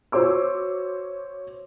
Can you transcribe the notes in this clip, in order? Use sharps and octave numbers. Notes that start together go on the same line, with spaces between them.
F#4 C5 C#5 D6 E6